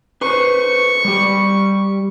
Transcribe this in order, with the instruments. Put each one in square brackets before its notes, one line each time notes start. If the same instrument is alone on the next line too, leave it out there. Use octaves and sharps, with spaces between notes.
[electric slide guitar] B4 C5 [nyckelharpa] C#6
[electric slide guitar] G3 G4